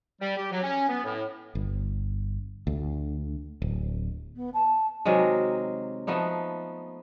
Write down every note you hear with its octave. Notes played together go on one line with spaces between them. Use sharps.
G3
G4
F#3
C#4
B3
A2
G1
D2
D1
B3
A5
C3 D#3 F#3 G#3
F3 A3 B3 D#4